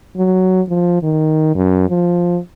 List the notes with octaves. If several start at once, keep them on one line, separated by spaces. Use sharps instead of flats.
F#3
F3
D#3
F#2
F3